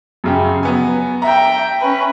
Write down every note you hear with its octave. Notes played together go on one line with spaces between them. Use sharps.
F#2 C#3 G4
F#3 B3 G#5
E5 G5 A#5
C#4 B4